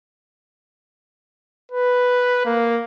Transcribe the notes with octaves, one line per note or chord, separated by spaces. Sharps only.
B4
A#3